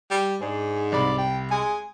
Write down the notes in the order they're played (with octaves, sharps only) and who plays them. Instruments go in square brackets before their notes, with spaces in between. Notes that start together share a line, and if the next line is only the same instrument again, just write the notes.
[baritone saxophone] G3
[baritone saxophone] G#2 [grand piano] D4 [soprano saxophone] G#4
[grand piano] C2 B5 [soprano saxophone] D5
[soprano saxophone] G5
[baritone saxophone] G#3 [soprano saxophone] G#5